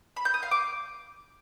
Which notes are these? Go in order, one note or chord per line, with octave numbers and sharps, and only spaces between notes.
B5
G6
D#6
F5
D6